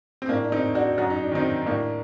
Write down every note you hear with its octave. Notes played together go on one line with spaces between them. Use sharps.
C4
A2 A#3 D4
D4
C4 D#4
D4 F#4
F#2 F#4
D#4
D4
D#3 C4 D#4
A2 A#3 D4